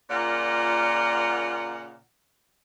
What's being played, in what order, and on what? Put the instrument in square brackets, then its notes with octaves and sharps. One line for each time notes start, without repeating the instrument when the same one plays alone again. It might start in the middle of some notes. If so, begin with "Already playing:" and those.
[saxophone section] A#2 C#3 F4 A#4 D5 F#5